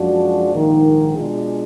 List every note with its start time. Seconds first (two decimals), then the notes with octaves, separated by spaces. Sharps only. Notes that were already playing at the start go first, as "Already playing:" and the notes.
Already playing: F#2 F3 G#3 D4 F#4
0.50 A#1 G#2 D#3 A#3
1.15 B2 G#3 D4 F4 G#4